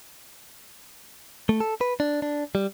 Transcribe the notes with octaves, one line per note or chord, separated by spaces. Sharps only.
A3
A4
B4
D4
D4
G3